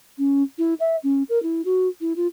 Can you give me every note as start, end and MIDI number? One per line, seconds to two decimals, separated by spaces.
0.18 0.43 61
0.58 0.74 64
0.80 0.96 76
1.04 1.23 61
1.29 1.42 70
1.43 1.62 64
1.65 1.88 66
2.01 2.13 64
2.16 2.27 65